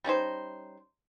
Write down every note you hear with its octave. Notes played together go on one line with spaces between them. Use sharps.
G3 C#4 D#4 C5